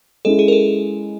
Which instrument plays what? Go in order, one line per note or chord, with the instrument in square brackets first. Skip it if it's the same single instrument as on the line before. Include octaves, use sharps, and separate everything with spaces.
[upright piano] G#3 C#4 E4 [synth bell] A4
[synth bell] G#4
A#4
A4